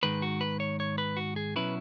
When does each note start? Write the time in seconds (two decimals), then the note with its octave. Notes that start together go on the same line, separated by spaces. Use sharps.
0.03 G#2 D#3 G#3 B4
0.22 F#4
0.41 B4
0.60 C#5
0.80 C#5
0.98 B4
1.17 F#4
1.36 G#4
1.56 B2 F#3 C#4 E4 B4